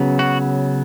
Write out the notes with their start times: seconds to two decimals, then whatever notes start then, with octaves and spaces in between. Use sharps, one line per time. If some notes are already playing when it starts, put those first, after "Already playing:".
Already playing: C#3 F#3 B3
0.19 F#4